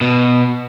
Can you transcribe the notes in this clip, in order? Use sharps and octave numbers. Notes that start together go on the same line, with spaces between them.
B2